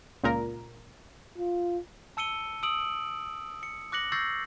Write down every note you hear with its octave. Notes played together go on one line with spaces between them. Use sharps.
C#2 A#2 A#4
F4
A5 E6 C#7 D#7 G7
D#6 E6 D7 F#7
C#7
D6 F#6 A#6 C#7 F#7
C#6 E6 G6 A6 A#6 C7